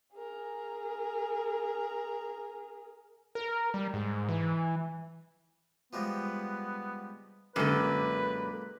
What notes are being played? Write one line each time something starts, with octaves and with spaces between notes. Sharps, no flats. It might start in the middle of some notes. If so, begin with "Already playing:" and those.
G#4 A#4
A#4
G3
G#2
E3
F3 G3 G#3 B3
F#2 A#2 D3 G#3 G4 B4